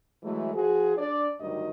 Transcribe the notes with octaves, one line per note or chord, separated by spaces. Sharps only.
E3 F#3 G#3 A3
F3 F#4 G#4
D4 D5
D2 G2 D#3 F#3 D#5